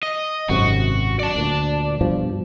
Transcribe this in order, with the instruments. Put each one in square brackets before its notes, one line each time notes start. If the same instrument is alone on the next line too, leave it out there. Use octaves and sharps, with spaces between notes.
[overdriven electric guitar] D#5
[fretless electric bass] G#1 F#2 C3 [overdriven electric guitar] F#4
[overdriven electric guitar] D5 A5
[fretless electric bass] D2 A#2
G2 B2 F3